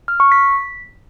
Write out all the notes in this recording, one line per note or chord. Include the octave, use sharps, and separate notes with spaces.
F6
C#6
B6